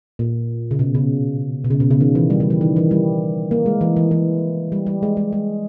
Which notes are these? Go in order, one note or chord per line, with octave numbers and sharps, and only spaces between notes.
A#2
C#3
B2
C#3
B2
C#3
B2
C#3
D#3
E3
G3
G3
E3
D#3
E3
G3
A#3
G#3
E3
E3
E3
G3
G3
G#3
G#3
G#3